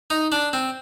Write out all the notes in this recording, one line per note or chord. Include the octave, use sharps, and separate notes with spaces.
D#4
D4
C4